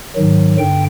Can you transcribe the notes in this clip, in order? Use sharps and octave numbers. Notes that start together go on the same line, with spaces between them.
G#2 D#3 F#3
G2 D3 G5